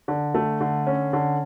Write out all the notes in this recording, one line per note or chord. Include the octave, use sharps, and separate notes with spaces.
D3
A3
D3
C#4
D3